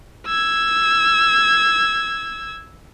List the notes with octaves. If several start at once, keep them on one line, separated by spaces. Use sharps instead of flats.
E6 G#6